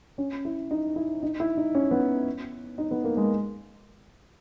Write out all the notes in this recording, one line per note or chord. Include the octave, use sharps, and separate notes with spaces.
C#4
E4
D#4
E4
D#4
E4
D#4
C#4
B3
D#4
B3
A#3
G#3